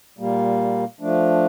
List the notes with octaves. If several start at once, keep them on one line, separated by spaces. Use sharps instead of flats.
A#2 G3 A#3
F3 A3 D4